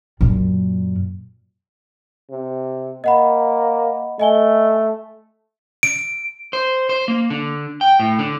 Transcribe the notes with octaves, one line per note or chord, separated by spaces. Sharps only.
F#2 A#2
C3
A#3 D#5 F#5 B5
A3 D#5 G#5 G7
D7
C5
C5
A#3
D3
G5
A2
D3